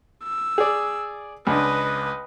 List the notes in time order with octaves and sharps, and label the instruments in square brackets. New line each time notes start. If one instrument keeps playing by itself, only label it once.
[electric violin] E6
[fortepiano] G#4 D5
[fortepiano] C#2 D4 [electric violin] B4 D#5